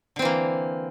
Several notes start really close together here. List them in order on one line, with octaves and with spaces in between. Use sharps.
D3 C4 E3 A#3